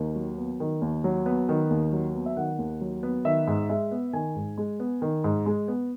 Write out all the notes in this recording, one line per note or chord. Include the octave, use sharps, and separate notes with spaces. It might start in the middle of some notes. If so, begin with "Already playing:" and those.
Already playing: D#2 D#3
F#3
B3
D#3
D#2
F#3
B3
D#3
D#2
F#3
B3
E5
D#3 F#5
D#2
F#3
B3
D#3 E5
G#2
G#3 E5
B3
D#3 G#5
G#2
G#3
B3
D#3
G#2
G#3
B3